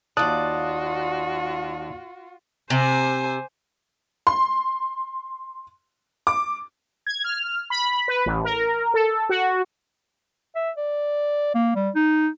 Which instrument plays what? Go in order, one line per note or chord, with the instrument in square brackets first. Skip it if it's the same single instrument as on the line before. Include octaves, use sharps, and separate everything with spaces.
[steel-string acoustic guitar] D#2 D5 [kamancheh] F4 F#4 [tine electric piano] A5 D#6 F#6
[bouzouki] C3 [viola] C5 G#5
[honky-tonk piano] C6
D6
[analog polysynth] G#6
F6
B5
B4
A1
A#4
A4
F#4
[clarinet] E5
D5
A#3
G3
D#4